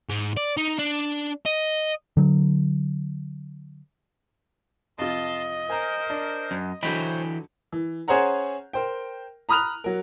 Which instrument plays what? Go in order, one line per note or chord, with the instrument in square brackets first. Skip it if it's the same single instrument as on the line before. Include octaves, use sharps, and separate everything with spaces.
[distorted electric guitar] G#2
D5
D#4
D4
D#5
[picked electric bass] D3 F#3
[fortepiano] F2 C3 F4 [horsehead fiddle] D#5 [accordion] A5 C6
[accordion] A#4 C5 [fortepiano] G#5 A#5
[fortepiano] D4
[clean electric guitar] F#2
[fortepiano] D3 F#3 D#5 [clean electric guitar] E3 G5 B5 [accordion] C5 C#5
[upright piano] E3
C#4 G#4 C5 C#5 F#5 A#5
A#4 C5 G5
A#5 B5 D#6 F6 F#6 F7
F#3 A#4